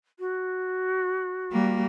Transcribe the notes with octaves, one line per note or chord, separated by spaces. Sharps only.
F#4
G3 A#3